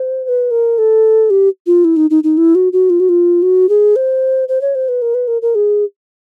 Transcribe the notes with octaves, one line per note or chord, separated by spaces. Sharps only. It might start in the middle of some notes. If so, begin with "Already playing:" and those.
Already playing: C5
C5
B4
A#4
A4
G4
F4
E4
D#4
D#4
D#4
E4
F#4
F#4
F4
F#4
F4
F#4
G#4
C5
C5
C#5
C5
B4
A#4
B4
A#4
A#4
G#4